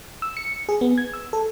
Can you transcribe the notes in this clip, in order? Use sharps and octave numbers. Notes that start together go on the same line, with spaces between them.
E6
C#7
G#4
B3
G#6
E6
A4